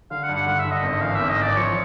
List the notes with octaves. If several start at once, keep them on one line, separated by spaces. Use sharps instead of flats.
D3 F5
F#5
G2
F#5
D3 F#5
E5
D3
D#5
G#1
E3 F5
G#1 E5
D#5
E3 D5
F3 C#5